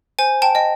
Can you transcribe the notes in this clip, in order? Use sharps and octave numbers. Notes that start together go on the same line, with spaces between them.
C5 G#5
G5 A5
D#5 G5